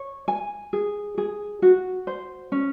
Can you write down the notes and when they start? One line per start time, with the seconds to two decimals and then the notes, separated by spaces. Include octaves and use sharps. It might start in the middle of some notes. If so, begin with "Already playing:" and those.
Already playing: C#5
0.28 G#5
0.73 G#4
1.18 G#4
1.62 F#4
2.07 C5
2.52 C#4